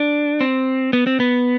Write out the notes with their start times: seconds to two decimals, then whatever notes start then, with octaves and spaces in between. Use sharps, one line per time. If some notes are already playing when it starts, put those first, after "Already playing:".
Already playing: D4
0.41 C4
0.93 B3
1.07 C4
1.20 B3